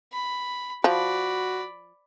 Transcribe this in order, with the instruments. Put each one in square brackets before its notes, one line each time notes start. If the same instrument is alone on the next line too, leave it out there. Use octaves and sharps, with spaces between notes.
[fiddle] B5
[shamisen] F3 [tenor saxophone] F#4 [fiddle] D5 B5